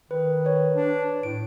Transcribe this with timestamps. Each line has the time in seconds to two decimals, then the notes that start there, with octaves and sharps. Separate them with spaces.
0.11 D#3 B4
0.45 B4 C#5
0.73 D4
1.23 A2 D7